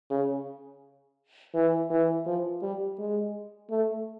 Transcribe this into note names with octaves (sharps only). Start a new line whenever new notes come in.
C#3
E3
E3
F3
G3
G#3
A3